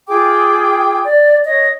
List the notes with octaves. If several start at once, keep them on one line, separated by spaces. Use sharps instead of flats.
F4 G#4 G5 D6
D5
C#5 D#5